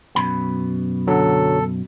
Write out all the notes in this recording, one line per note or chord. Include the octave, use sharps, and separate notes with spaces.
F#2 B2 B5
D3 F#3 A4